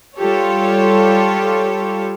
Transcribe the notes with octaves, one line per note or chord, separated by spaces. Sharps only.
G3 F4 G4 A4 C#5